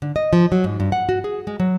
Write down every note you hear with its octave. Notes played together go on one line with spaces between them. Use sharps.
D3
D#5
F3
F#3
G#2
G2
F#5
F#4
G#4
G#3
F#3